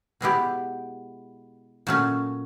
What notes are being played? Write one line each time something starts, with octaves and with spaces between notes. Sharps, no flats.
B2 G#3 B3 E4 G4
A#2 F#3 A3 C#4